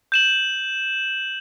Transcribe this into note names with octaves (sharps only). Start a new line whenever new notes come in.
G6 E7 F#7